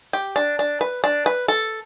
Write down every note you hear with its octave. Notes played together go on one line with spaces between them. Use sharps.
G4
D4
D4
B4
D4
B4
A4